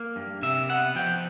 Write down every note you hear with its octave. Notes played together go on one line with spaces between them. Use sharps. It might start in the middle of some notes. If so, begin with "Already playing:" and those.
Already playing: A#3
G2
C3 E5
B3 F#5
F3 G5